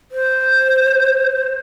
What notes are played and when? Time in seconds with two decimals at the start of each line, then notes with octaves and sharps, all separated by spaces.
0.12 C5